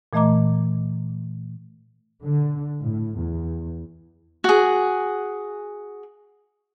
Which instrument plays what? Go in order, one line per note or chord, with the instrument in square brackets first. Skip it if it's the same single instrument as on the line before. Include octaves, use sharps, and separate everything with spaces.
[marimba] A#2 E3 A3 D#5 A#5 D6
[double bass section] D3
A2
E2
[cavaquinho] F#4 G#4